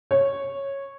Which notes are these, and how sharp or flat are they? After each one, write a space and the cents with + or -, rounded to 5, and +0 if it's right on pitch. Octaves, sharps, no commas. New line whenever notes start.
C#5 -10